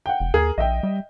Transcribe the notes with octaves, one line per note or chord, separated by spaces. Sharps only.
F#5 G5
F1
D#2 G#4 A#4
A#1 D#5 E5 G5
G3